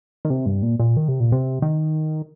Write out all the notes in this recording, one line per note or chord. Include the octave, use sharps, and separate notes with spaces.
D#3
C3
G2
A#2
A#2
D#3
C3
A#2
C3
D#3